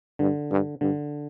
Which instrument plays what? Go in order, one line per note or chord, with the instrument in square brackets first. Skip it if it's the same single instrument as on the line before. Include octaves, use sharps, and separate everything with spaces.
[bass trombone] G2 [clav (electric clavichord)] D3
[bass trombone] G2
[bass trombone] G2 [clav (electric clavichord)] D3